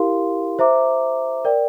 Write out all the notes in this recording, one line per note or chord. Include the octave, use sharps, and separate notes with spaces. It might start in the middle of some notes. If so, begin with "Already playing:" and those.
Already playing: E4 G4 A#4 F5 C6
C5 E5 A#5 D6
A#4 D5 G5